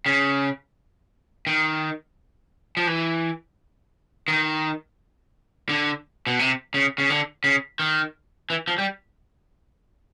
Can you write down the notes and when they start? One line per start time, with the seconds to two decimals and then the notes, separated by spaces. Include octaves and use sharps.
0.06 C#3
1.47 D#3
2.77 F3
2.87 E3
4.28 D#3
5.69 D3
6.27 B2
6.39 C3
6.74 C#3
6.98 C#3
7.10 D3
7.44 C#3
7.79 D#3
8.50 E3
8.68 F3
8.78 G3